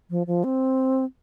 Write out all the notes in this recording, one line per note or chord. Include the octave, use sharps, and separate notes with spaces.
F3
F3
C4